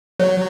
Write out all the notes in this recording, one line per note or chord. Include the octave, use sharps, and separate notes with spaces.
F#3 C#5